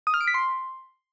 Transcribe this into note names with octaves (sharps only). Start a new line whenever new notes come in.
D#6
F6
D7
B6
C6